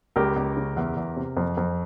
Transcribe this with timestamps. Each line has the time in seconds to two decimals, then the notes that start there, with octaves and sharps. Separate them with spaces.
0.16 C#2 G4 A#4
0.36 C#2
0.57 C#3
0.76 E2
0.96 E2
1.16 C3
1.37 F2
1.57 F2